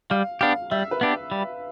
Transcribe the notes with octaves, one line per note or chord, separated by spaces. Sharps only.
G3 F5
B3 D4 G4 F5
G3 E5
B4
B3 D4 G4
G3